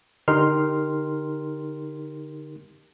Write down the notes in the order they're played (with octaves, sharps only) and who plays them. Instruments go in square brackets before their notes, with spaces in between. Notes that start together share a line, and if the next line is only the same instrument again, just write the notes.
[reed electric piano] D3 D#4 G4 A#4 C6 F6